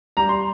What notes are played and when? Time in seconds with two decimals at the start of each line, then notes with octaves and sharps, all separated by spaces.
0.17 G3 A#5
0.29 C6